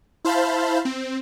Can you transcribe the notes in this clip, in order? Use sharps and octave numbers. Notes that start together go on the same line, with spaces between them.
E4 C5 F5 A5 B5 G6
C4